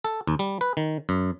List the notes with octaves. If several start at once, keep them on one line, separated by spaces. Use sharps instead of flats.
A4
D#2
G3
B4
D#3
F#2